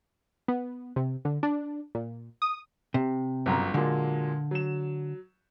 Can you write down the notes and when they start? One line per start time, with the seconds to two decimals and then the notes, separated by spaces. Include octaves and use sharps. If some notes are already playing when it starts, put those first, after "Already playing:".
0.48 B3
0.96 C3
1.25 D3
1.43 D4
1.95 A#2
2.42 D#6
2.94 C3
3.46 G1 F#2 A#5
3.74 A#2 D3 F#3 G#3
4.51 F#3 E7